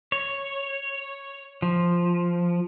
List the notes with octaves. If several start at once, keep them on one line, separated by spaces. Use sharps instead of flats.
C#5
F3